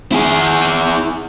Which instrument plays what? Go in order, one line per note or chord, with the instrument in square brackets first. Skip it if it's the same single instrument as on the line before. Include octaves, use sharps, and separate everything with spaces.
[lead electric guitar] E4 G#4